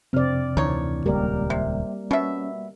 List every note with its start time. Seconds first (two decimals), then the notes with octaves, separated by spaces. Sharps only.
0.13 F2 C3 C4 D5 F6
0.57 D2 D3 E3 D#4 C#5
1.06 D#1 C#2 G3 A#3 G4 A#4 D5
1.50 C3
2.11 B2 C#4 E5